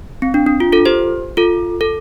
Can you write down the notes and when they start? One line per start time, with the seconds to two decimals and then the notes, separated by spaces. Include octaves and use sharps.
0.22 C4
0.34 D4
0.46 D4
0.60 F4
0.72 F4 A4
0.86 G4 C5
1.37 F4 A4
1.81 A4